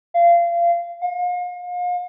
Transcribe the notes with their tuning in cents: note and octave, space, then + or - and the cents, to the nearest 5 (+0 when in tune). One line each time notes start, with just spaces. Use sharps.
F5 -25
F5 +40